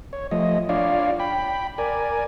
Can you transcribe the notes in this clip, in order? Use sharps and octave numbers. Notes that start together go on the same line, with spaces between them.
C#5
F3 A3 D#5
D4 F4 C#5 D5 F5
G5 B5
A#4 D5 G#5